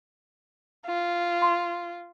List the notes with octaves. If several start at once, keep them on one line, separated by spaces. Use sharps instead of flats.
F4
C6